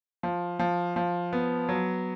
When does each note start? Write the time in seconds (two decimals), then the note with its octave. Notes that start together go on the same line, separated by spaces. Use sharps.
0.23 F3
0.59 F3
0.96 F3
1.33 B3
1.69 F#3